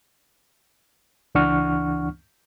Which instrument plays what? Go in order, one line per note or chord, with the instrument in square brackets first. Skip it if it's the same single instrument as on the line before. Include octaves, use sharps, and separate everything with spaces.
[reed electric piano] C#2 E3 D4 F#5 C#6 F6